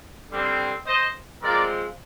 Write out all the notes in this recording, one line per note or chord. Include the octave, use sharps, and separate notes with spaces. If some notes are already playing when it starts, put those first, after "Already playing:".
D3 G3 C4
C5 D#5
F3 G#3 C4 A#4 D5